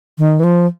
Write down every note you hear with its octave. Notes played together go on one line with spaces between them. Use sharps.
D#3
E3
F3